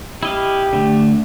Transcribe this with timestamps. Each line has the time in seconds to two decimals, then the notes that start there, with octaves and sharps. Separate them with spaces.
0.23 E4 G4 D#5 F5
0.73 D3 A3